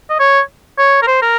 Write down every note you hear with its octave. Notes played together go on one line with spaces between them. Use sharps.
D#5
C#5
C#5
A#4
C5
A#4